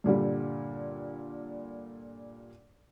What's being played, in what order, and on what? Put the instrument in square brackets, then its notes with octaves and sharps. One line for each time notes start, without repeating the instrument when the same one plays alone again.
[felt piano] G2 A#2 D3 G3